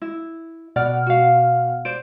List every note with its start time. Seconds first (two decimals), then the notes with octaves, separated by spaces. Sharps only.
0.02 E4
0.76 B2 D5 F#5 F6
1.06 F#4 F5
1.85 C5 D5 D7